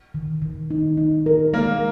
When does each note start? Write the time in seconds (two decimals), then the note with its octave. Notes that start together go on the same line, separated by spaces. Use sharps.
0.14 D#3
0.42 D#3
0.70 D#4
0.97 D#4
1.26 A#4
1.53 G#3 A#3